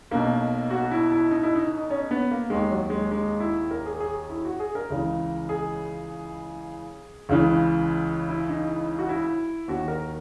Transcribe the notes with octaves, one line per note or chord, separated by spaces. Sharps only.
B1 B2 A#3
F#4
E4
E4
D#4
E4
D#4
C#4
B3
A#3
D#2 D#3 G#3
F#3
G#3
G#3
E4
A#4
G#4
G#4
E4
F#4
G#4
A#4
C#2 C#3 E3
G#4
C#2 C#3 E3
E4
D#4
F#4
E4
D#2 D#3 F#4
A#4